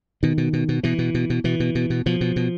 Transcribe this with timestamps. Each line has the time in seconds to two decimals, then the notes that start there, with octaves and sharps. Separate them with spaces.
0.23 B2 D#3
0.38 B2
0.53 B2
0.69 B2
0.83 B2 E3
0.98 B2
1.14 B2
1.30 B2
1.44 B2 E3
1.60 B2
1.75 B2
1.90 B2
2.06 B2 F3
2.21 B2
2.36 B2